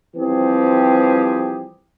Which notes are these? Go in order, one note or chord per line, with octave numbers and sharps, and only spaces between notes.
E3 F3 G3 C4 G4 G#4